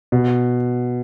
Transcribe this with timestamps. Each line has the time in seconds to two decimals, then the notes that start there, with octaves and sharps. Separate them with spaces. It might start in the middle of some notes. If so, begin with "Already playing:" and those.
0.12 B2